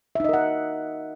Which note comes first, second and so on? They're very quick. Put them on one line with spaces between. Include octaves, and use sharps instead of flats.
E5 D#4 D#5 A#4 F#5